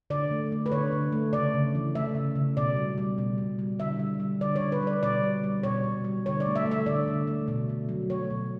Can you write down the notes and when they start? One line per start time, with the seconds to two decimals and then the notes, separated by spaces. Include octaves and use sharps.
0.10 D3 D5
0.31 A3
0.52 A3
0.66 B4
0.72 D3 C#5
0.92 D3
1.12 A3
1.33 C#3 D5
1.54 C#3
1.75 E3
1.95 A3 E5
2.15 C#3
2.35 C#3
2.57 B2 D5
2.76 G3
2.98 G3
3.18 B2
3.38 B2
3.59 G3
3.79 D3 E5
3.99 G3
4.20 G3
4.41 D3 D5
4.56 C#5
4.61 D3
4.72 B4
4.82 G3 D5
5.03 B2 D5
5.23 G3
5.44 G3
5.63 B2 C#5
5.84 B2
6.04 G3
6.26 D3 C#5
6.40 D5
6.46 A3
6.56 E5
6.66 A3
6.71 E5
6.86 D3 D5
7.08 D3
7.27 A3
7.48 B2
7.69 B2
7.89 F#3
8.10 A3 C#5
8.30 B2